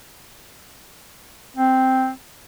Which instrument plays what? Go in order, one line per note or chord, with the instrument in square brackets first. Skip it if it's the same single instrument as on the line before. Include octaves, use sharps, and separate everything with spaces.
[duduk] C4